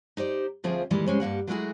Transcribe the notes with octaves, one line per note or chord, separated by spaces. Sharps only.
D#4 G4 C5 D5
D2 F3 C4 F4 G#4 E5
A#2 D#3 E3 G3 G#3
C3 G#3 C#4 C5
G2 G3 A#3 F#5
F#3 G#3 A3 E4 F#4 G#4